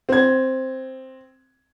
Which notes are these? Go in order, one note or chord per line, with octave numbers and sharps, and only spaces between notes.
C4 G#6